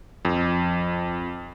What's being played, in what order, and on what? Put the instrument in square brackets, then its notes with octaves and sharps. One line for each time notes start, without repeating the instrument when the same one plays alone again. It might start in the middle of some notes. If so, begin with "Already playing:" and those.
[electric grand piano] F2